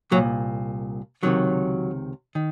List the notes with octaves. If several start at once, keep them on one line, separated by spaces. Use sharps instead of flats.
C2 A#2 F#3
C#2 C3 D#3 F#3
D#3